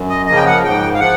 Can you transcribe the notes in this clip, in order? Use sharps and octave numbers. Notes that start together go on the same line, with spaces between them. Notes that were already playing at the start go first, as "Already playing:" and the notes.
Already playing: F#2
D#5
C#3 F3 A#3 D#5
G5
F#5
G#2 G5
F5
F3 F#5